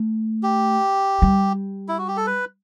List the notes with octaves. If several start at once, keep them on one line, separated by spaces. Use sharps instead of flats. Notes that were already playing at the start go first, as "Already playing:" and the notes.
Already playing: A3
G4
G3
E4
F#4
G4
A4
B4